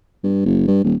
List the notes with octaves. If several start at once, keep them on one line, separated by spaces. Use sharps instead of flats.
G2
F#1
G2
D#1